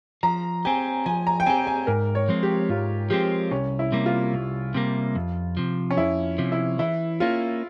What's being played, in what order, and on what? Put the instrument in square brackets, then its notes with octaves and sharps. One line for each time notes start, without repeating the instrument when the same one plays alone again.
[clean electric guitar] F3 [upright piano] A#5
[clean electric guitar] C4 G4 [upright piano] G#5
[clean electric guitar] F3 [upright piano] G#5
[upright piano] A#5
G5
[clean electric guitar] C4 G4 [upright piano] G#5
[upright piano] G#5
[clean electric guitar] G#2 [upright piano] A#4
[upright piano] C#5
[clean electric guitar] F3 G#3 C4
[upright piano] G4
[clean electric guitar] G#2 [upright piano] F4
[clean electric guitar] F3 G#3 C4 [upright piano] G4
[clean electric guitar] C2 [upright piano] C#4
[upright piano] E4
[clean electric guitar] C3 G3 A#3
[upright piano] F4
[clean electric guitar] C2
C3 G3 A#3
F2
C3 F3
[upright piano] C#4
[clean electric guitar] F2 [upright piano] E4
[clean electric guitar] C3 F3
[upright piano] E4
[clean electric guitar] E3 [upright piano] E4
[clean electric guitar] A#3 C#4 [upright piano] F4